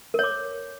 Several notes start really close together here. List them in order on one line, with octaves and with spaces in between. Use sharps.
A#4 C#5 D6